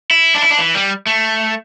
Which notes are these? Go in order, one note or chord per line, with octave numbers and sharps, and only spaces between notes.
E4
D4
E4
D4
E3
G3
A3